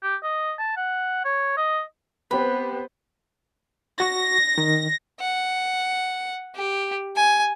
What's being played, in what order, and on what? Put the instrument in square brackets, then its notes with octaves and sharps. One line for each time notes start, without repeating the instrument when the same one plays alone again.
[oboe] G4
D#5
A5
F#5
C#5
D#5
[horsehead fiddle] B3 C5 [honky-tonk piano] C4 G4 B4 [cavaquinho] B5
[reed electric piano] F#4 C#6 [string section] A#6
[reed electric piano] D#3
[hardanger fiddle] F#5
G4
G#5